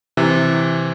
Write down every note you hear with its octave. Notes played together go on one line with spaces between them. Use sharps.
C3 E3